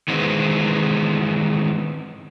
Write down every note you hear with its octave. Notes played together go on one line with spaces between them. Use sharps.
D#3 E3 G#3 B3 C4